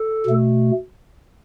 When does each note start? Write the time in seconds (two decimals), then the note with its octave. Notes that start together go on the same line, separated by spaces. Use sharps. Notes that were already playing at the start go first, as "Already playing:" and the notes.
Already playing: A4
0.26 B2 A3